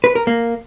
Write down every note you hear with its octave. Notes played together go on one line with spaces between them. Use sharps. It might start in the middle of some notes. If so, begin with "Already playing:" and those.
B4
A#4
A#3